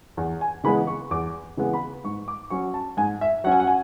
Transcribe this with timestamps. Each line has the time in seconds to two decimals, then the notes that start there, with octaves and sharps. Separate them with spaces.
0.17 E2
0.41 G#5
0.64 C#3 E3 G#3 B3 B5
0.87 C#6
1.11 E2 D6
1.57 C#3 E3 G#3 B3
1.74 B5
2.04 G#2 C#6
2.28 D6
2.50 F#3 C#4 C#6
2.74 A5
2.97 G#2 G#5
3.21 E5
3.44 F#3 C#4 F#5
3.52 G#5
3.60 F#5
3.67 G#5